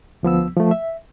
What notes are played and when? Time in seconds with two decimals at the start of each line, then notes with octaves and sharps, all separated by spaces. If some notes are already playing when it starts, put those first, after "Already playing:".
0.23 D2 F3 B3 E6
0.57 F3 A3
0.71 E5